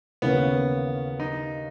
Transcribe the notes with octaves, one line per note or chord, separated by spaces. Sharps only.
D#2 C#3 E3 A#3 B3 C#4
D#4